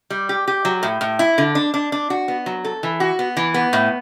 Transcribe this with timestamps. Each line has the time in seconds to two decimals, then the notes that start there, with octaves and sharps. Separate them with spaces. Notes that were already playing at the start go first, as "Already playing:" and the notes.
0.10 G3
0.29 G4
0.48 G4
0.65 F#3
0.83 A2
1.01 A2
1.19 E4
1.38 D3
1.55 D4
1.74 D4
1.92 D4
2.10 F#4
2.28 B3
2.46 F#3
2.65 A4
2.83 E3
3.00 F#4
3.19 B3
3.37 E3
3.54 B3
3.73 A2